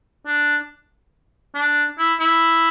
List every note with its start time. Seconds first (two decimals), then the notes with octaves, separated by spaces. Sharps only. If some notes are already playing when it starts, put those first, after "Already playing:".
0.27 D4
1.55 D4
1.99 E4
2.20 E4